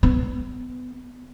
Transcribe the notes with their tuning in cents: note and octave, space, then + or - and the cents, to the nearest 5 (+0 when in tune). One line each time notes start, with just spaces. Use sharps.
B3 +20